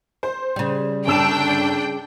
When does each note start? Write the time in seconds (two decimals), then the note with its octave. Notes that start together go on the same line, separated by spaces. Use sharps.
0.23 C5
0.56 C#3 G3
1.07 G1 D4 G5 E6 E7